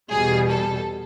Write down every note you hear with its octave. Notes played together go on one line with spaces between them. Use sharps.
E2 B2 G3 G#4
A4